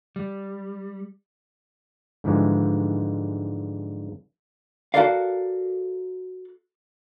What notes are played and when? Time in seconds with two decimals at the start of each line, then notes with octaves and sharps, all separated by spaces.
0.16 G3
2.24 G#2 D3 E3 F3 G3 G#3
4.94 F#4 A4 A#4 D5 F5